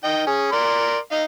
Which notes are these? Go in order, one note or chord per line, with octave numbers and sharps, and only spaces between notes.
D#3 D#5 G5
C#4 G#4
A#4 D5 C6
D#4 D#5 F5